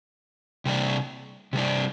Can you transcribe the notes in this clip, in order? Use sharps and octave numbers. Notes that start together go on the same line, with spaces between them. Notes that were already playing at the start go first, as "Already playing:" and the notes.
C3 G3 D4
C3 G3 D4